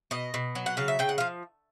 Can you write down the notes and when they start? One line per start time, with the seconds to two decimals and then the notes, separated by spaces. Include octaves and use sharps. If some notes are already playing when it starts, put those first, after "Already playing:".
0.11 B2 D#5
0.34 B2
0.55 F#3
0.66 F#5
0.77 C#3 F5
0.88 E5
0.99 C#3 G5
1.09 F#5
1.18 F3 F5